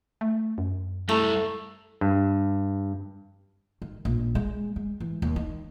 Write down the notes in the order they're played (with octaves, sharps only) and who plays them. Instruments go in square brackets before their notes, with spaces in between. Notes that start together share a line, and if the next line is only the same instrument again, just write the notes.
[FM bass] A3
F#2
[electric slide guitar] G3 E4 A#5 [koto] A3
[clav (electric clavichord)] G2
[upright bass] D#3
A#1
G#3
G#3
E3
D#2
D#4